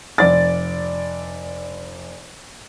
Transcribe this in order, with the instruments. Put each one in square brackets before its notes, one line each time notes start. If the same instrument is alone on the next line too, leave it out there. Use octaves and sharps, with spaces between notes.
[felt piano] F1 D5 A6